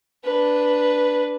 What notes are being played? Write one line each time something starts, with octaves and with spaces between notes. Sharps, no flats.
D4 B4